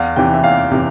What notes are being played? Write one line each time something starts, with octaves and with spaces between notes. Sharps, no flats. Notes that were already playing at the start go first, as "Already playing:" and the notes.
Already playing: E2 F5
C3 E3 G5
E5
E2 F5
C3 E3